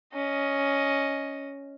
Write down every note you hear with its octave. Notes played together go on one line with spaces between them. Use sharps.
C#4 D#5